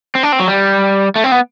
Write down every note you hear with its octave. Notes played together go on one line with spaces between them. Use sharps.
C4
D4
C4
F#3
G3
A3
C4
B3